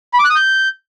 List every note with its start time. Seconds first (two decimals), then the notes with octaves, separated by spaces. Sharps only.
0.14 B5
0.19 D6
0.24 F#6
0.30 D#6
0.35 G6